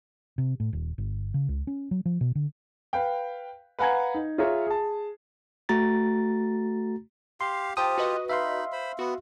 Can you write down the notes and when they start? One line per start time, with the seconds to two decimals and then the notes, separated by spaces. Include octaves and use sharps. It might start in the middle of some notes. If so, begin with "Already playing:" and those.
0.38 C3
0.60 A2
0.73 D#1
0.98 G1
1.34 C#3
1.49 C#2
1.67 C#4
1.91 F#3
2.05 F3
2.21 B2
2.35 D3
2.93 B4 F5 G5
3.79 B4 F5 F#5 G#5 A#5 G#6
4.14 D#4
4.38 F4 G#4 C#5 E5 A#5
4.67 G#4 A5
5.69 A3 F#4 A#5 A6
7.41 G4 F5 C6
7.77 F4 G4 C5 G5 A5 D#6
7.98 F#4 B4 D#5
8.29 D#4 E5 F5 B5 C6
8.72 C5 B5
8.99 B3 F#4